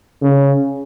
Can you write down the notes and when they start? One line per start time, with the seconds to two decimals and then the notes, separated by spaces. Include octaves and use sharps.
0.22 C#3